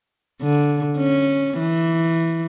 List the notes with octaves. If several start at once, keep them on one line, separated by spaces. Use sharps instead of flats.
D3
C#4
E3